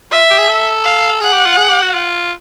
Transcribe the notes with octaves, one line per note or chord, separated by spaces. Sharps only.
F4 E5
G4
G#4
A4
F5
G#4 F#5
G4
F4
G#4
G4
F#4
F4